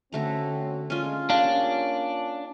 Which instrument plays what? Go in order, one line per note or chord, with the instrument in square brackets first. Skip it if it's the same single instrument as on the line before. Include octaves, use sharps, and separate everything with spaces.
[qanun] D3 A3 A#5 [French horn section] C4 C#4 F#4
[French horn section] G#3 D4 [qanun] C#4 F4
[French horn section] A#3 F4 C#5 [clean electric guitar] D4 [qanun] G4 G#4 [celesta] F5